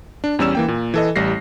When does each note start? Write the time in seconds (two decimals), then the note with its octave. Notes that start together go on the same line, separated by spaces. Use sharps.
0.24 D4
0.39 E2 G3 C#4 D5 E6 E7
0.55 E3 A#3 G5
0.68 A#2
0.94 E3 A4 D#5
1.16 A1 G3 A#6 C7